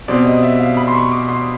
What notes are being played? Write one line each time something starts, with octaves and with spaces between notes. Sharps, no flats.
B2 G3 C4 D5
D#5
E5
F5
B5
C6
C#6
D6
C6